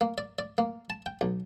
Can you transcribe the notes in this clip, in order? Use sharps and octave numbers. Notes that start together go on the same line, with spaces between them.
A#3
D5
D5
A#3
A5
G5
B1